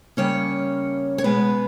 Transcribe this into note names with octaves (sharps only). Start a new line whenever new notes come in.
C#3 G3 A#3 C#4 C#5
C#5
B2 G#3 B3 B4